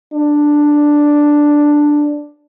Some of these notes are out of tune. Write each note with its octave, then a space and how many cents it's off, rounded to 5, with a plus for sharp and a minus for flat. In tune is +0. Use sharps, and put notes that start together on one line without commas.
D4 +5